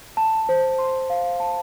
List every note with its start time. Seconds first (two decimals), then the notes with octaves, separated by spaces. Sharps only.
0.17 A5
0.49 C5
0.78 C6
1.10 F5
1.40 A5